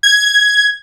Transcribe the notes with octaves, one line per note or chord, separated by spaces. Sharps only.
G#6